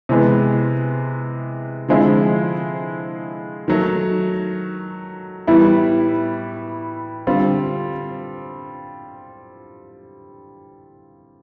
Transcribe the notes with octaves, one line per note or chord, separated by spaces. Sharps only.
C3 E3 G#3 B3
D3 F3 G#3 C4 E4
D#3 F#3 A3
A2 E3 G3 B3 E4
D3 G3 C4 F4